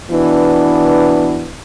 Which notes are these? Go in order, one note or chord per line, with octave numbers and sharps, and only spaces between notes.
B2 E3 B3 D4